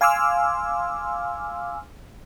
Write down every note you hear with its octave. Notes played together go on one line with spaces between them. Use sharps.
F5 G#5 C6 D6 E6 F6